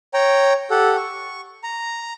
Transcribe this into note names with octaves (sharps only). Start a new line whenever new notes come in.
C#5 G5 A#5
G4 A4 F#5
C#6
A#5